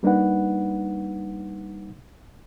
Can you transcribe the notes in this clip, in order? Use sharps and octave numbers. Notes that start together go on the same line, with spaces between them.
G3 A#3 D4 D#4 B4 F#5